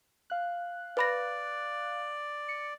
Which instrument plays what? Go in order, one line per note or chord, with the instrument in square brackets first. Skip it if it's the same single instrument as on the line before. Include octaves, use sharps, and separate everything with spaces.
[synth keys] F5 F#6
[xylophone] B4 B5 A#6 [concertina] D5
[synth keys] C#7